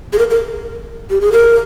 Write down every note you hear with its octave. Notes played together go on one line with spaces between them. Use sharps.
G#4
A#4
A#4
G4
G#4
A#4